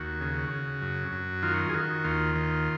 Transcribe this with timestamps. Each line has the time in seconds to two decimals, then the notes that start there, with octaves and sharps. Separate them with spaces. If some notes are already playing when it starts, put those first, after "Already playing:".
Already playing: D#2 F#4
0.21 C#3
0.50 C#3
0.81 F#2
1.12 F#2
1.43 D#3 F4
1.69 G#4
1.74 D#3 F#4
2.04 D#2 F4
2.35 D#3